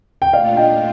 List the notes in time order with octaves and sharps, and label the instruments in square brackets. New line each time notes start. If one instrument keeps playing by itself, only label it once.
[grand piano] G5
[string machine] A#2 A3 D4 F4 [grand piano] D5 F5
[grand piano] D#5 G5